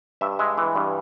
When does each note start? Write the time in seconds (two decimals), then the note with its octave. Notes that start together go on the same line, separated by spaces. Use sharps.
0.21 G2 E5
0.39 G#3 E5
0.58 E3
0.75 G2